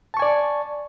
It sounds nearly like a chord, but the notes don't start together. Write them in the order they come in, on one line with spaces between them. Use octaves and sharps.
A5 C#6 G#5 D5